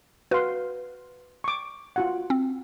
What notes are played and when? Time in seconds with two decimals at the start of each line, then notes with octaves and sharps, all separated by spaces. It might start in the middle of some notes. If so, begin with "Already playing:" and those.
0.31 F#4 B4 F5 C6
1.44 C#6 D6
1.96 F4 F#4 F#5
2.30 C4